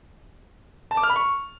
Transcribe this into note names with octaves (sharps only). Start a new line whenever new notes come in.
A5
D6
F6
B5
C#6